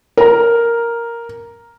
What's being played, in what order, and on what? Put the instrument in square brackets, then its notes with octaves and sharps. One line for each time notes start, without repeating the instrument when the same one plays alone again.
[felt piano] A#4 A#5